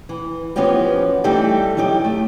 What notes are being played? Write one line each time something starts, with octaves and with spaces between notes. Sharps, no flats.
E3
E3 F3 B3 C#4 F#4 G4
E3 G3 A3 D#4 G4 A4
E3 F#3 D#4 G4
A3